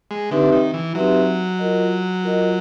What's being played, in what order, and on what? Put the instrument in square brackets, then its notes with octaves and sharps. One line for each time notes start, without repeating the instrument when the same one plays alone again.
[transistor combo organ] G#3
[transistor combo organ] D3 [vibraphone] C4 D#4 G4 B4 E5
[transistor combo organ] D#3
E3
[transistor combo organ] F#3 [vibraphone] C4 D#4 G4 B4 E5
[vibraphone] F4 A#4 D#5
F4 A#4 D#5